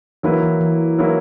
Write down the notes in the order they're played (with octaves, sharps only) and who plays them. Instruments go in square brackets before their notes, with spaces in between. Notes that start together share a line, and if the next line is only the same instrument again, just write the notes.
[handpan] E3 [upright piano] F#3 A#3 E4 B4
[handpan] E3
E3
[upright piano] F#3 A#3 E4 B4